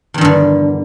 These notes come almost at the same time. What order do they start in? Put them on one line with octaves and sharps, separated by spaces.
E2 D#3 G2 D3